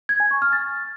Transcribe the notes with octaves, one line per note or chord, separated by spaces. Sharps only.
G#6
G#5
C#6
F6
A6